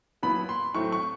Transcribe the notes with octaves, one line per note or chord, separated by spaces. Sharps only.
A#2 F#3 B3 E4 B5
C6
A2 F#3 A3 C4 C#6
C#6